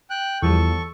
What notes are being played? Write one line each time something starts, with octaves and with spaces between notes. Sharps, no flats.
G5 F#6
E2 F3 G3 A4 C#6